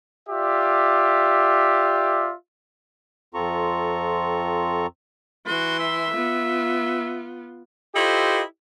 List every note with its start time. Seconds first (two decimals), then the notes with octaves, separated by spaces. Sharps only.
0.29 F4 G4 D5 E5
3.34 F2 C4 F4 A4 A#5 C#6
5.46 E3 F#4 C6
5.79 E5
6.14 B3 F4
7.95 E4 F4 G4 A4 C5 D#5